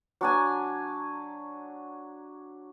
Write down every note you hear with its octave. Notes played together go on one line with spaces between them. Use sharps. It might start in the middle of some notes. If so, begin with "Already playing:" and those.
F#3 D4 G#5